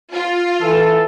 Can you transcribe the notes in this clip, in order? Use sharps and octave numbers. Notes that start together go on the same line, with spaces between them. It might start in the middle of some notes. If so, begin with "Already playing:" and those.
F4
E3 A4 A5